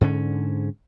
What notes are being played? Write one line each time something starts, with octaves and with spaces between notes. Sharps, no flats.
G#2 D3 C#4